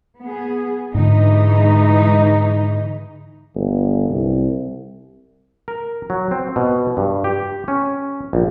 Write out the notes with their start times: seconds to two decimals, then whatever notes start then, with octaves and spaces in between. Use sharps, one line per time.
0.22 B3 G#4
0.95 G#2 D3 E3 G#3 D#4
3.55 G1
4.09 C2
5.68 A#4
6.10 F#3
6.31 C4
6.56 B2
6.97 G2
7.24 G4
7.68 C#4
8.33 A#1